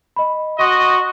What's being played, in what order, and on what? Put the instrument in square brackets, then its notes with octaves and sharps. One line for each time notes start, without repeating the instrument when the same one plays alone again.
[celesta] D#5 B5
[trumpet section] F#4 D#5 [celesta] C6 C#6